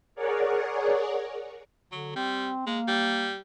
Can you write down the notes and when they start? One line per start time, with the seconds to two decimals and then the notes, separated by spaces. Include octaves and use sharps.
0.15 G#4 A#4 C#5 D5 F#5
1.92 D3 F#3
2.16 G3 C4
2.67 G#3 A#3
2.88 G3